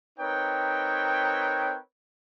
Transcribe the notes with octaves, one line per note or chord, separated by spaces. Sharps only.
C4 D#4 A#4 B4 C#5 G5